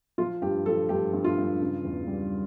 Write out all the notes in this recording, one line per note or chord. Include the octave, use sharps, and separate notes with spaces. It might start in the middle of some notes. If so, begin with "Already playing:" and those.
F3 F4
G2 G4
F3 A4
G2 G4
G2
F4
G2
C#3
E2
G3